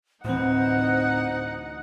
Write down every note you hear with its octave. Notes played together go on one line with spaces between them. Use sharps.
D2 A2 E3 C4 D#4 C5 F#5